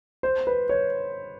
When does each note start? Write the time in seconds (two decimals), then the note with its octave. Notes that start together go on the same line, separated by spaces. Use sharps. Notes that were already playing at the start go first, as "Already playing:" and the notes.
0.23 C5
0.47 B4
0.69 C#5